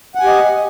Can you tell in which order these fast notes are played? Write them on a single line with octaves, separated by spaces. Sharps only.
F#5 G#5 G4 D#5